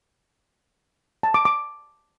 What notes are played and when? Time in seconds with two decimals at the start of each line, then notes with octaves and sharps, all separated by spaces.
1.23 A5
1.34 D6
1.45 D6